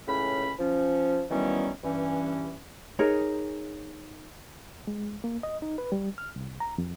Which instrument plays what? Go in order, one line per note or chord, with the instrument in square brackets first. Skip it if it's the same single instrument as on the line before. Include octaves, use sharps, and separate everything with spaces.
[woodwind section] C#2 A2 C#3 C#4 B5
F3 C#4
D#3 E3 F#3 G3 B3 C#4
G2 E3 C#4
[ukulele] D#4 G#4 A#4 C#5
[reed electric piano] G#3
A#3
D#5
D#4
B4
G3
F6
C2
A#5
F2